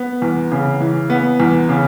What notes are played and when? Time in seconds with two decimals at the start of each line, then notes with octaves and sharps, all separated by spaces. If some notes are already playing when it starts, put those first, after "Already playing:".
Already playing: B3
0.22 E2
0.52 C#3
0.81 E3
1.10 B3
1.40 E2
1.69 C#3